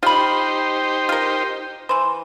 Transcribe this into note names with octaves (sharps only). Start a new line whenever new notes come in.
D#4 F4 G4 C5 B5
F4 A#4
E3 C5